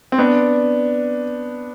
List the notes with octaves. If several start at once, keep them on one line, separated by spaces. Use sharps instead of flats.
C4
B3 D4